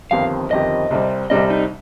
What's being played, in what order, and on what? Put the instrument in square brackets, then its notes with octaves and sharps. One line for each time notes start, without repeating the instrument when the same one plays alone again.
[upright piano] G1 F2 D#3 C4 G4 [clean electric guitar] F5
[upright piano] G1 F2 D#3 C4 G4 [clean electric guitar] D#5
[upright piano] C2 C3 G3 C4
[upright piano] C2 C3 G3 C4 [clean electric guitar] D#5
[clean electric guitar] D#4